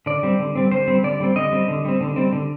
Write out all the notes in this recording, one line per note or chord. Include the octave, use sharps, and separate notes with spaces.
D3 D5
G3 C4
D3
G3 C4
D3 C5
G3 C4
D3 D5
G3 C4
D3 D#5
G3 C4
D3
G3 C4
D3
G3 C4
D3